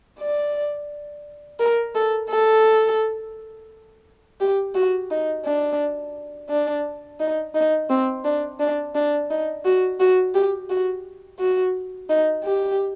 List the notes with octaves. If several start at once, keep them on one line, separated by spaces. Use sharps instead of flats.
D5
A#4
A4
A4
G4
F#4
D#4
D4
D4
D#4
D#4
C4
D4
D4
D4
D#4
F#4
F#4
G4
F#4
F#4
D#4
G4